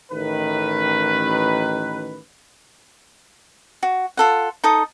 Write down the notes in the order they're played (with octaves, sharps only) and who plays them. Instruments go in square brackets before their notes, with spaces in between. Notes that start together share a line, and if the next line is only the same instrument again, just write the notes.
[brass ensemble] A1 D#3 B4
[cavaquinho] F#4
F4 A4 F#5
D#4 A4 D#6